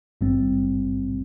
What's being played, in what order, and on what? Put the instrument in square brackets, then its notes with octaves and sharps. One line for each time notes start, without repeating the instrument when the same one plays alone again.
[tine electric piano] G#1 G2 G3 C4